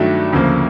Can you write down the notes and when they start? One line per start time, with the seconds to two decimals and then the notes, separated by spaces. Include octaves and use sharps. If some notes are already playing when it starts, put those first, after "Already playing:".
Already playing: G2 D#3 F#3 A3 D4
0.32 D2 C#3 F3 A#3